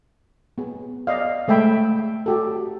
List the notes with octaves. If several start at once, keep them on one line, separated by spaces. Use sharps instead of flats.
B3 G#4
D5 D#5 F5
G#3 A3 E5 G5 B5
F#4 G4 A4